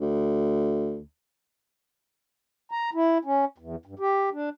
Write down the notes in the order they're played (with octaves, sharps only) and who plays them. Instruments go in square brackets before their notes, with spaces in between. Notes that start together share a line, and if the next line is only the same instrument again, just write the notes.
[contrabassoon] D2
[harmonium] A#5
E4
C#4
E2
G2
G4
D4